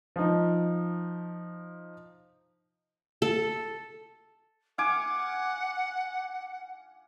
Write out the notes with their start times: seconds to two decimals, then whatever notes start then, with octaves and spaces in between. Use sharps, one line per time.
0.16 F3 D#4
3.22 A4
4.78 F5 F#5 G#5 D6